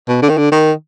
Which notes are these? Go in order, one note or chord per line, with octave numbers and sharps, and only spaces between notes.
B2
D3
D#3
D3
D#3